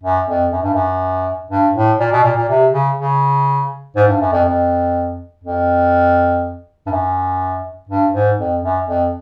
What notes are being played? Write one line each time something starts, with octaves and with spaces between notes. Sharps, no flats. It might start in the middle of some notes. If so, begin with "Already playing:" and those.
F#2
F2
F#2
G2
F#2
G2
A2
A#2
B2
A#2
A#2
C3
C#3
C#3
G#2
G2
F#2
F2
F2
F2
G2
F#2
G2
G#2
F2
F#2
F2